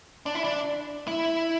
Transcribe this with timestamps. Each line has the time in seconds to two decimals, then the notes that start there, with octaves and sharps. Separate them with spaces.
0.26 D4
0.35 E4
0.44 D4
1.07 E4